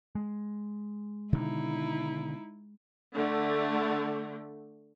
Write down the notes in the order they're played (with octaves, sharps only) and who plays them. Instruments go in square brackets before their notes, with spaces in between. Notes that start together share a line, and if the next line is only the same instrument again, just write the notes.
[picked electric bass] G#3
[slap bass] B2 D3 D#3 [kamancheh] D#4 E4
[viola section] D3 A3